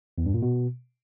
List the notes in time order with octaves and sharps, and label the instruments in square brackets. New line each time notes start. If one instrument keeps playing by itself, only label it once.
[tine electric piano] E2
G2
A#2
B2